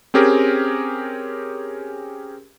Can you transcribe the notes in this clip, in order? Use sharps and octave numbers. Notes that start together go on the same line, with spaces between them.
C4 C#4 G4 G#4 A#4